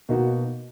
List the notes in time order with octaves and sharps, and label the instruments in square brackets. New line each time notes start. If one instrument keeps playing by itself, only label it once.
[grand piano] B2 A#3 D#4 F#4